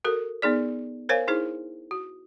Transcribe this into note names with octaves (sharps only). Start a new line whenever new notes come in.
F#4 A4 A#4
B3 D#4 G#4 D5
A#4 C5 C#5 F5 G#5
D#4 E4 G#4 C5
F#4